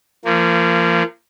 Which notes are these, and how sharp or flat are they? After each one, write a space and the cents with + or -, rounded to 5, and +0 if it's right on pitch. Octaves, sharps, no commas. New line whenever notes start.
F3 -35 A#3 -25